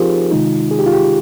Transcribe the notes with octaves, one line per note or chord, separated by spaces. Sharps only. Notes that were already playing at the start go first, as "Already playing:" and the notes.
Already playing: F3 C4 D#4 F4 G4 G#4 A#4 C5
C3 D#3 G#3 D#4
G#4
G4
F4
G4